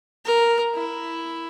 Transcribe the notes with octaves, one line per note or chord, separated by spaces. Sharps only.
A#4
E4